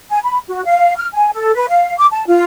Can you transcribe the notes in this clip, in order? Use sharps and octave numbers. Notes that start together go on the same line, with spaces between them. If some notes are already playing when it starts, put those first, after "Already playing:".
G#5
B5
F#4
F5
F6
G#5
A4
B4
F5
D6
A5
F4